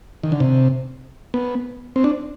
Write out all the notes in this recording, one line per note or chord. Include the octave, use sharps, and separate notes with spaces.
D#3
D3
C3
B3
C4
D4